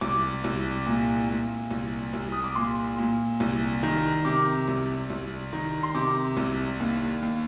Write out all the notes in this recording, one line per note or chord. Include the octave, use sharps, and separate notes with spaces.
C2 D6
C2
A#2
A#2
C2
C2
D#6
D6
A#2 C6
A#2
C2
D#3
C3 D6
C2
C2
D#3
C6
C3 D6
C2
D#2
D#2